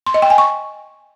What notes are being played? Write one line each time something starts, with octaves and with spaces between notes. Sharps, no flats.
C6
D#5
G5
G#5
C#6